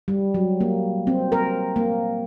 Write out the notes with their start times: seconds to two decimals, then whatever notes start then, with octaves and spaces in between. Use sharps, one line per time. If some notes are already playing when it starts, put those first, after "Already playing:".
0.08 G3
0.34 F#3
0.60 A#3
1.07 C4
1.32 A#4
1.76 A#3